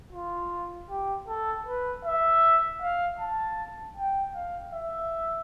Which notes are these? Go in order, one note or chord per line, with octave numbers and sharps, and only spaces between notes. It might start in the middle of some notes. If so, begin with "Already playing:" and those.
F4
G4
A4
B4
E5
F5
A5
G5
F5
E5